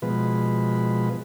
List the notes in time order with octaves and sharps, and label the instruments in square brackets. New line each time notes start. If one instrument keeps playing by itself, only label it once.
[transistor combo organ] B2 F3 G#3 B4